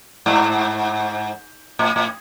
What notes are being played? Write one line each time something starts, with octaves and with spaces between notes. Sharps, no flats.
G#2
A2
A2